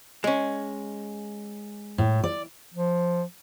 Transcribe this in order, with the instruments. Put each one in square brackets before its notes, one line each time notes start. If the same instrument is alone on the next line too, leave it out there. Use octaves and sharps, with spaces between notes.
[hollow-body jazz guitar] G#3 C#4
[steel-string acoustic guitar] A2
D5
[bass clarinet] F3